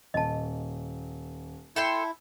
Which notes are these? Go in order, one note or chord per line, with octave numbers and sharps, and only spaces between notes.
D#1 D#5 A5
E4 A4 E5 G5 C6